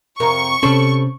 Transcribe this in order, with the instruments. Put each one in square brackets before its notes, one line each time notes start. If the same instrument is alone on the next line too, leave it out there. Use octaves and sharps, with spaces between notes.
[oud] F2 C3 A#4 [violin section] C#6
[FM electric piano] C3 C#4 [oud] G3 A4 C5